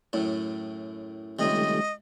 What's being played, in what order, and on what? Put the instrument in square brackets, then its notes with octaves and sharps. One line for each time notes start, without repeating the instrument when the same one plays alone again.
[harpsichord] F#2 A2
[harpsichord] C#2 C3 [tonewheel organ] D#3 G3 A3 [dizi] D#5